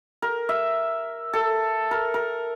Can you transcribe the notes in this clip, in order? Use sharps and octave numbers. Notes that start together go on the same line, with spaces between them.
A#4
E5
A4
A#4
A#4